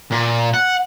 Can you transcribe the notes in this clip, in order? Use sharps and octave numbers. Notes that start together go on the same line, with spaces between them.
A#2
F#5